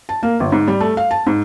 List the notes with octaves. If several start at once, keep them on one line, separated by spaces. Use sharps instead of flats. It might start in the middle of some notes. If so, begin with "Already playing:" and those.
A5
A#3
G1
G#2
G3
A3
F5
A5
G#2